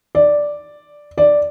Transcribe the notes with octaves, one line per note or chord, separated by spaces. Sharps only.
D5
D5